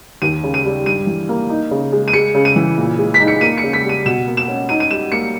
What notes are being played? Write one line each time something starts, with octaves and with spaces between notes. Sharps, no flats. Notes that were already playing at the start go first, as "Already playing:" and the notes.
D#2 D#7
C#3
D#7
G3
G2 D#7
E3
A#3
D#4
C#3
G#3
D#7
G#3 C#7
C#3
D#7
E3
A#2
G#3
B6
D#4
C#7
A#3 D#7
C#7
C#3
B6
G3
D#7
B2 E7
A#3
E7
C#4
D#4 D#7
D#7
G3 E7
A#3 C#7